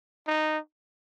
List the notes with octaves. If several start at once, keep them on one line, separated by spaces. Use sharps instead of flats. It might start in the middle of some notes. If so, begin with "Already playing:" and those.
D#4